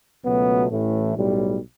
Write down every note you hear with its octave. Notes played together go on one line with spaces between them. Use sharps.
C#2 B2 F#3 A3 B3
A1 A2 E3 A3
B1 A2 G3